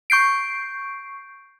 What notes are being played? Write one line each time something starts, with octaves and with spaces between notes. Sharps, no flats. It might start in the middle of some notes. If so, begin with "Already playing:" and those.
C#6 G6 C7 D7